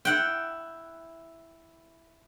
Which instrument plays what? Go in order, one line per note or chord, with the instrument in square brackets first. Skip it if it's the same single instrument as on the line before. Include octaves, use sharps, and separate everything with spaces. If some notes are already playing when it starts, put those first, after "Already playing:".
[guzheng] E4 F#5 G5